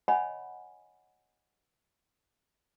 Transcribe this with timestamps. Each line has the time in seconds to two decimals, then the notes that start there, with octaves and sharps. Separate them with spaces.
0.08 C#5 D#5 F#5 G#5 B5